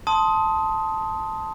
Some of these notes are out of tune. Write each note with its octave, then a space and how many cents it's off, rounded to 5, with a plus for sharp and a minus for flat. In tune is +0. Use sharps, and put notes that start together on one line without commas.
A5 +0 C6 +0 D#6 +15